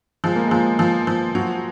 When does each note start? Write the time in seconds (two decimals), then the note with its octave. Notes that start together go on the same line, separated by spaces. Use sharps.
0.24 F3 G#3
0.36 A#3
0.47 F3 G#3
0.79 F3
1.07 F3
1.35 F#3